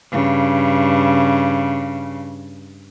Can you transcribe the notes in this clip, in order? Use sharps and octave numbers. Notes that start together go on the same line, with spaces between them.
G2 C#3